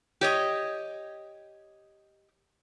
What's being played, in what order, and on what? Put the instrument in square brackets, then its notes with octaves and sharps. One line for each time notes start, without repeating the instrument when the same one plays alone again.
[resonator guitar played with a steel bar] G4 C#5 D#5